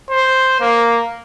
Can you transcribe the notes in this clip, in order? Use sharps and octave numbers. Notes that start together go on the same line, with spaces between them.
C5
A#3